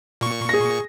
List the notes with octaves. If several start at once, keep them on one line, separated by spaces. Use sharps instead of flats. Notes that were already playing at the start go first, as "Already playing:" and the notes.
A#2 C#6
G#4 A#6